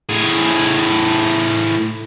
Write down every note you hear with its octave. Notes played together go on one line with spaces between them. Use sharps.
A2 G#4